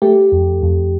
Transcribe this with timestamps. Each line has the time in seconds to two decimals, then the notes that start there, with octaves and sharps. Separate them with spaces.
0.02 A3 G4
0.32 F2
0.62 F2